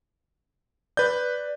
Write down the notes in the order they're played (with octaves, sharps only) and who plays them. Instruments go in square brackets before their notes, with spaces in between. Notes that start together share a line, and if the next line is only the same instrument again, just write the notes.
[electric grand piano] B4 G6 [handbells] D5